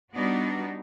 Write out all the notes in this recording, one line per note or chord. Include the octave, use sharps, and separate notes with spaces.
G3 B3 D4 D#4 F#4